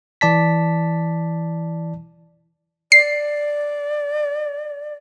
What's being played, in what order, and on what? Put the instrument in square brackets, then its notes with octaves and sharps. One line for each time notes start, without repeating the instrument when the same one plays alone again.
[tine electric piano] E3 D5 A5 B6
[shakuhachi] D5 [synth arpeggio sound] C7